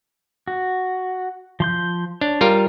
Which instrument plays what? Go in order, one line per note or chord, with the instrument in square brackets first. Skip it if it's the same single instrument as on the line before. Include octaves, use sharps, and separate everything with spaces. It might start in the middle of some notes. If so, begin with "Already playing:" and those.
[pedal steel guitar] F#4
F3 C6 G6
[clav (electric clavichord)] D4 [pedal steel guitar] C#5
[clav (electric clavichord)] G3 F4 A#4